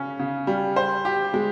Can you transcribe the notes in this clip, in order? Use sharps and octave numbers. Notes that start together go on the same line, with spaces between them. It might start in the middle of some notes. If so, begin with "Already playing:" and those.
Already playing: C#3 C#4
C#3
G3
C5
G4
G#3